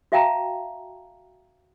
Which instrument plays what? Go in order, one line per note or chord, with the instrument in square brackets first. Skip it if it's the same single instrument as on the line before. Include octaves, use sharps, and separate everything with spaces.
[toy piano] F#4 E5 F5 G5 A5 A#5